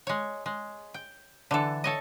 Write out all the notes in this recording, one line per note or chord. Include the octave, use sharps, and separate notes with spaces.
G#3 C#5
G#3
G5
D3 E3 A4
A4 C#5 D#5